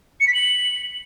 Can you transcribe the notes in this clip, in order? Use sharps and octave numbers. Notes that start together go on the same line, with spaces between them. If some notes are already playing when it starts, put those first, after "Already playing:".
C#7
B6
F#7